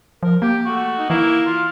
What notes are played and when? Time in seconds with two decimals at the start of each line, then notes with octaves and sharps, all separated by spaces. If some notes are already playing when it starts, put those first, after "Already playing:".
0.23 F3 A#4
0.42 A#3 G4
0.66 A3 F#4
0.98 D#4
1.10 E3 A#3 E4
1.46 F4